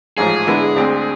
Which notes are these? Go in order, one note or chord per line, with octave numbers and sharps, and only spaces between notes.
A1 G#2 F3 G#4
D3 G#3 B3 E4
D2 D3 G#3 C4